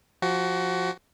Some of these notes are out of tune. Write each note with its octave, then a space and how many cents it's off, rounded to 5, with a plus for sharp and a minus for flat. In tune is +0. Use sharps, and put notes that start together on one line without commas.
F3 +15 F#4 +25